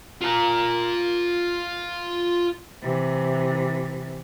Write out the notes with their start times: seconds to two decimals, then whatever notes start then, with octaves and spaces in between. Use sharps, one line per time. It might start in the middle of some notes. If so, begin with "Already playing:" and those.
0.21 F4 A#5
2.82 C3 E3